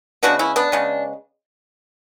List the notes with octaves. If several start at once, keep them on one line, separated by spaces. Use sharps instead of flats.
C#3 G#3 B3 D4 F#4
C#4 E4
B3 D4
C#3 G#3 B3